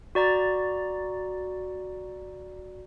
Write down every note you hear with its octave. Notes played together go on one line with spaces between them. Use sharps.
F#4 D5 A#5 A6